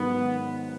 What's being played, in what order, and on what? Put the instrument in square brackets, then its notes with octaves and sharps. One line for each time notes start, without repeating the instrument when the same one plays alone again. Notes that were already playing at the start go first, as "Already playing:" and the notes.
Already playing: [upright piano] G#2 D#3 F#3 C#4 [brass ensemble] B3